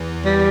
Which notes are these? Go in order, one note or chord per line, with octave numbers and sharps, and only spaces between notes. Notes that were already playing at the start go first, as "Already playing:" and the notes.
Already playing: E2 E3
G3